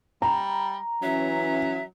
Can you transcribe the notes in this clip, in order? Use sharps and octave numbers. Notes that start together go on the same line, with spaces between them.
G3 A#5
E3 F#3 C#4 E5